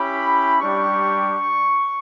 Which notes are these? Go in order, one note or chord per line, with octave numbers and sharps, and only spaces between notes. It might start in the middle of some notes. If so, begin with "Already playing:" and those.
Already playing: C#4 E4 G4 B5
G3 D4 G4 C#6